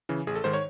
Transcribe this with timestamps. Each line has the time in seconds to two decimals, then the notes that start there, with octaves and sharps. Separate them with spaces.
0.09 C#3 E3
0.27 A1 G#4
0.35 A4
0.44 G#2 D#3 C5
0.54 C#5